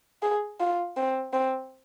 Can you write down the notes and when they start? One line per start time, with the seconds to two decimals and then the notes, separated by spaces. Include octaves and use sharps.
0.23 G#4
0.60 F4
0.97 C4
1.33 C4